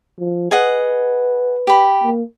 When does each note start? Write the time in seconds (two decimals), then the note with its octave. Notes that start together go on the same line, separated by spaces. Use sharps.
0.19 F3
0.51 G#4 B4 D#5 F#5
1.67 G4 B5
2.04 A#3